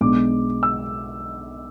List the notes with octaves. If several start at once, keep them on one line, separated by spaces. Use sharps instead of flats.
B1 B2 G#3 D4 D6
E6